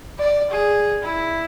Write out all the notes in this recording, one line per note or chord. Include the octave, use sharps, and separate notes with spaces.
D5
G#4
E4